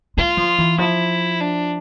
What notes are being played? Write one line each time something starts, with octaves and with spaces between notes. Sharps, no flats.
G#3 F4
F3
E3
F3 E4
D4